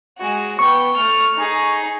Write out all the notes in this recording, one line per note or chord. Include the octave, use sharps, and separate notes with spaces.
G#3 F#4
B3 G5 C#6
A3 F6
D#4 G#4